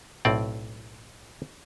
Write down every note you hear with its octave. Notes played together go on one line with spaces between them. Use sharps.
B1 A2 C4 D5